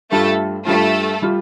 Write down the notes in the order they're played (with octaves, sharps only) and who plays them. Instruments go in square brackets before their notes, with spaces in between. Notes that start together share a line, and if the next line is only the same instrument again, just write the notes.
[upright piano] G2 G3 F4 [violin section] A3 A4
[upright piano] G2 G3 F4 [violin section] A3 A4
[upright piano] G3 F4